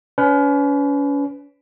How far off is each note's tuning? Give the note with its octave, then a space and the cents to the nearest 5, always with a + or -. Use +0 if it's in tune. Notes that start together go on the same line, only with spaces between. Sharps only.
C#4 +35 B4 +25